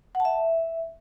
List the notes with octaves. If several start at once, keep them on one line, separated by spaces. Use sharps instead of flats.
F#5
A5
E5